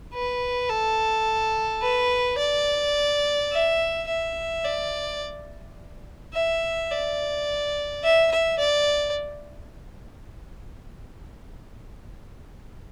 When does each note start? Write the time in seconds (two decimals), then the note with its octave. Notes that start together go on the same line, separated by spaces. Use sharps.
0.14 B4
0.69 A4
1.82 B4
2.39 D5
3.52 E5
4.08 E5
4.65 D5
6.33 E5
6.91 D5
8.04 E5
8.32 E5
8.59 D5